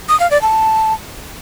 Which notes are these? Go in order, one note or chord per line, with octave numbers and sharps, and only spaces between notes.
D#6
F5
D5
A5